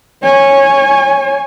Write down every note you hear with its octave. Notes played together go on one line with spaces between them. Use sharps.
C#5 G#5